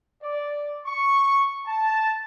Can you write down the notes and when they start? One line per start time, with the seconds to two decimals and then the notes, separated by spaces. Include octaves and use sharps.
0.22 D5
0.85 C#6
1.67 A5